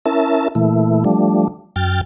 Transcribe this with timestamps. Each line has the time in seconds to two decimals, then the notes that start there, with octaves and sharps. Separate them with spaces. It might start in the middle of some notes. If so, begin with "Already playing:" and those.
0.06 C#4 E4 A#4 E5 A5
0.55 A#2 E3 A3 E4
1.04 F3 G3 A3 D4
1.76 F#2 G5 F6 A6